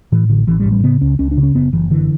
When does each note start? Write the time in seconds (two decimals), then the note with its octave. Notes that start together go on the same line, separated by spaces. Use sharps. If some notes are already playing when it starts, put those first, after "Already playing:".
0.12 A2 E3
0.29 A1 D3
0.47 A1 E3
0.60 G3
0.66 A2
0.72 G3
0.83 C#3 B3
1.01 C#2 C#4
1.19 C#2 C#4
1.31 D4
1.37 C#3
1.43 C#4
1.54 F#1 B3
1.73 F#1 E3
1.91 D3 E3